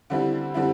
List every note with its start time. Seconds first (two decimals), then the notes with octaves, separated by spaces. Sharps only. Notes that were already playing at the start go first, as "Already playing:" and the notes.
0.10 D3 G3 C4 E4
0.54 D3 G3 C4 E4